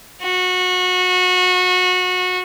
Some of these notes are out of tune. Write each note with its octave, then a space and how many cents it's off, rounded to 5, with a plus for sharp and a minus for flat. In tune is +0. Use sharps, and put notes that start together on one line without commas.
F#4 -25